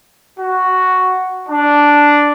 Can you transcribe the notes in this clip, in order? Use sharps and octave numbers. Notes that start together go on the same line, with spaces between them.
F#4
D4